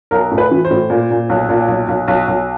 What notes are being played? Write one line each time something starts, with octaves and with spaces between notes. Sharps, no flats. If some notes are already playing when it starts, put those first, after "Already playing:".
B1 A#4
A2
B4
E3
C5
A2
A#2
A#2
B1
A#2
B1
B1
B1
B1